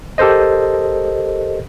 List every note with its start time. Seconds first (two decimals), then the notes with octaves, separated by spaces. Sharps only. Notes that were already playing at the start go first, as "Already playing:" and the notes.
0.18 G4 A4 A#4 C5 D#5